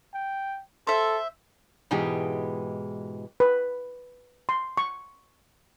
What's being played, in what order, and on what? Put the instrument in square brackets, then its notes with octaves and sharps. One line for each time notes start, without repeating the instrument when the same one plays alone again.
[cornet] G5
[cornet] A4 [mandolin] C5 E5
[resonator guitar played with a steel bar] G#2 B2 E3 G#3 G4
[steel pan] B4
C6
C#6